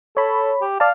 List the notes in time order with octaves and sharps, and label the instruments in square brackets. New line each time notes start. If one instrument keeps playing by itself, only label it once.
[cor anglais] A4 [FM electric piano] C#5 B5
[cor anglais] G4
[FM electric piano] D5 A5 [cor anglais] F5